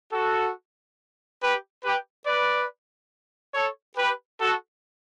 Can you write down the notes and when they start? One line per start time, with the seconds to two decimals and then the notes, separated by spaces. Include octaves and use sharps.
0.12 F#4 A4
1.41 G4 B4
1.83 G4 B4
2.26 B4 D5
3.54 A4 C#5
3.97 G4 B4
4.41 F#4 A4